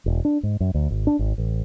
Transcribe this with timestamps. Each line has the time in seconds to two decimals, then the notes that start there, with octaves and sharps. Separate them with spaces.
0.06 E1
0.25 D4
0.43 G#2
0.60 F#2
0.74 D2
0.90 G#1
1.07 D4
1.19 G#1
1.38 A1